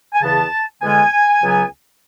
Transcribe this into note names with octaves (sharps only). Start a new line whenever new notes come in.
G#5
E2 C#3 E3 B3 A5
E2 D3 G#3 B3 G#5
C#2 C#3 F#3 B3